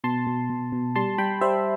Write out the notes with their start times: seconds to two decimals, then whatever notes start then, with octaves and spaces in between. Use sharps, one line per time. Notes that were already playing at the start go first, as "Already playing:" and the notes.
0.04 B2 A5 C6
0.27 B2
0.50 B2
0.72 B2
0.95 G3 A5 C6
1.18 G3 G5 B5
1.41 G3 C5 E5